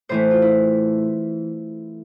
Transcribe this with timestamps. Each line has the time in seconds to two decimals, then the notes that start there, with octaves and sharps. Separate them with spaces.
0.09 A2 E3 A3 C5
0.31 F4
0.42 E4